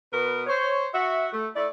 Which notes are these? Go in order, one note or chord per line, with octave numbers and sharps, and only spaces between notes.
B2 A#4 B4
C5 C#5
F#4 E5
A3
A3 E4 D5